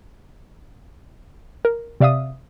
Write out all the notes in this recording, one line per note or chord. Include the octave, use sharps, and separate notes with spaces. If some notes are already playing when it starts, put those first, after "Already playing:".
A#4
C3 D5 E5 F5 D#6